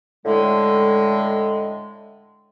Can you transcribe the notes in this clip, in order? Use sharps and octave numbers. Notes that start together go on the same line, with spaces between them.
A2 D3 G#3